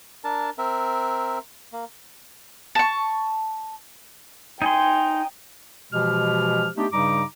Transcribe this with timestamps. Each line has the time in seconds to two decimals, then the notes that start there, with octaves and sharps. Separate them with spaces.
0.24 D4 A#4 A5
0.58 C4 A#4 E5
1.73 A#3
2.75 A5 C#6
4.62 D#4 G5 G#5 C6
5.93 B2 E3 F3 G#3 G4 F6
6.77 A3 B3 D4 D#4 G4
6.93 G2 C#3 G3 D#4 A#5 D6